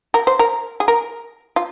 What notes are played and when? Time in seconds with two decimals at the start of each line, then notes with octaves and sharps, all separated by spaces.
0.14 A#4
0.27 C5
0.39 A#4
0.80 G#4
0.88 A#4
1.56 F4